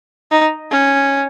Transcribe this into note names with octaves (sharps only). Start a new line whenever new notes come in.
D#4
C#4